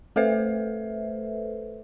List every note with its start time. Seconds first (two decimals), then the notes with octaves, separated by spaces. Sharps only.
0.16 A3 A4 B4 C5 E5